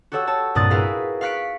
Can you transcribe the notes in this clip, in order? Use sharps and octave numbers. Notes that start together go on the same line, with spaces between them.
F#4 G4 A4 C#5 F#5 E6
C#5 A5
C2 G2 A#2 D#6 F#6 A6
E4 F#4 G#4 A#4 B4 F5
F5 C#6 F#6 B6 C#7 D7